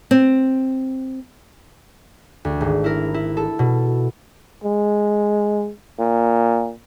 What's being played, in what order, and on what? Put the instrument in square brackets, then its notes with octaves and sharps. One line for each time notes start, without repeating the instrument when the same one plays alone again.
[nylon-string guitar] C4
[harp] D2
G#1
E4 A#4
E4
A4
B2
[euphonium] G#3
A#2